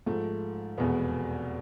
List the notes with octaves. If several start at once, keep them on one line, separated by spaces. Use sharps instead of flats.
G#2 F3 A3
F1 E2 B2 G#3 B3